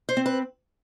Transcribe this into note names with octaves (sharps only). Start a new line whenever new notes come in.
C5
C4
B4